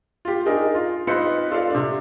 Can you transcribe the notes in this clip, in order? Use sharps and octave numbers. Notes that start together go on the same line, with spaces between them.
F4 G4
D4 D#4 G#4 A#4
F4
C4 D#4 F4 B4 C#7
F4 A4 D5 F5
C3 D4